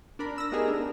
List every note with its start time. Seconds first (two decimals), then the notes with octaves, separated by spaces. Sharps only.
0.19 D4 A#4 B5
0.38 E6 A#6
0.51 A3 B3 D#4 G4 G#4 A#4
0.68 D4 A#5